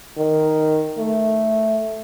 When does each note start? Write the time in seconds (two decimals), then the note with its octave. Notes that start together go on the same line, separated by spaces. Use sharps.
0.18 D#3
0.98 A3